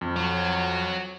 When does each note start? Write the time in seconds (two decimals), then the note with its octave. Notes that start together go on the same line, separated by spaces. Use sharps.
0.01 F2
0.16 F#4 C#5